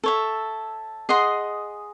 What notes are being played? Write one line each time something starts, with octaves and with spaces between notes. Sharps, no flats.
A4 C#5 E5
G#4 D#5 F#5 C6